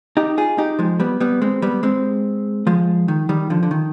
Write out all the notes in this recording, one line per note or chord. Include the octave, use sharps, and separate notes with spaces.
D#4 G4
F4 G#4
D#4 G4
F3 G#3
G3 B3
G3 B3
G#3 C4
G3 B3
G#3 C4
F3 G#3
D#3
D#3 G3
D3 F3
D3
D#3